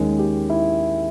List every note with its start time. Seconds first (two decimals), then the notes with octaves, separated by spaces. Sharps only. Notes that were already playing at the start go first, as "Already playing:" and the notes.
Already playing: D#2 D#3 G#3 C#4
0.19 G4
0.50 E4